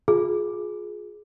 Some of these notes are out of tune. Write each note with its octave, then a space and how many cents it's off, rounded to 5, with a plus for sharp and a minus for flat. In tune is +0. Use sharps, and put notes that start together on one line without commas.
F4 +35 G#4 +15